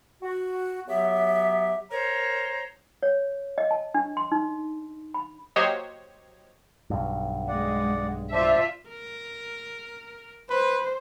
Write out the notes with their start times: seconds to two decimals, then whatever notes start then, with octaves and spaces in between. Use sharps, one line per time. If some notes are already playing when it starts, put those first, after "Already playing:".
0.22 F#4
0.87 F#2 F#3 B3 G4 E5
1.91 A#4 C5 C#5 A#5
3.03 C#5
3.58 D#5
3.71 A5
3.94 D4
4.17 C6
4.32 D#4
5.14 B5
5.56 F#3 A#3 G4 C5 C#5 D#5
6.90 B1 G2
7.48 G#3 D5 F#5
8.33 F4 C5 D5 E5 A5
8.89 A#4
10.50 B4 C5